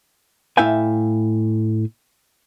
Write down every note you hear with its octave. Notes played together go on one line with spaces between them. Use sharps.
A2 E4 E5 F5 G5 G#5